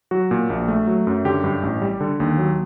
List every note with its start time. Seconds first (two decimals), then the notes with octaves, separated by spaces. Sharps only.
0.11 F#3 F#4
0.31 A#2
0.50 A#1
0.68 A3
0.87 F#3
1.07 F#2
1.25 D3 G4
1.44 G2
1.63 A1
1.82 G3
2.01 D3
2.20 D#2
2.38 F#3